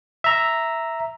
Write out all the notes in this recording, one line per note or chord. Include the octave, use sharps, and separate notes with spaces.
E5 A#5